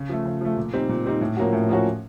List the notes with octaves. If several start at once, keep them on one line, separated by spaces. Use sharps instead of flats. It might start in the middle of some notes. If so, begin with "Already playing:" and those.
Already playing: C#3
F3 A3
C#3
F3 A3
A#2
G3 C4 D#4
A#2
G3 C4 D#4
A2
F3 A#3 C#4 F#4
A2
F3 A#3 C#4 F#4